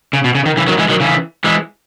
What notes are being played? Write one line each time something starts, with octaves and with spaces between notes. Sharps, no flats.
C#3
B2
C#3
D#3
C#3 E3
D#3 F#3
E3 G#3
D#3 F#3
C#3 E3
E3 G#3